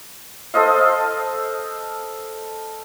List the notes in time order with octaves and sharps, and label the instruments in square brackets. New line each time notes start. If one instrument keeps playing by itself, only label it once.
[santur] A4 C5 D#5 F5